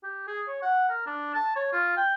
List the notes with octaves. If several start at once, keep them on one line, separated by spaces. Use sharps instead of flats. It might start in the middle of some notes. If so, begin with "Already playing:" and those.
G4
G#4
C#5
F#5
A#4
D4
A5
C#5
F4
G5